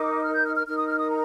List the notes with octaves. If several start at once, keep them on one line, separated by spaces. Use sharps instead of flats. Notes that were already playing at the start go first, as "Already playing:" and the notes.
Already playing: D#4 A#4 D6
F6
G6
F6
F6
D#4 A#4 F6
D#6
F6
D#6
A#5